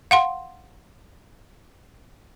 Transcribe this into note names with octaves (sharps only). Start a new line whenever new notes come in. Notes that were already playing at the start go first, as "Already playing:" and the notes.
F5 F#5 C6